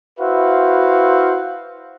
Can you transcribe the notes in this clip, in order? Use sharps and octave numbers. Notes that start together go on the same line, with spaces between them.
E4 F#4 B4 C5 E5 F5